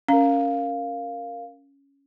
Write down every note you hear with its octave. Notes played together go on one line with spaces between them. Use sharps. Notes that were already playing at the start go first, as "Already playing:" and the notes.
C#4 A#4 F5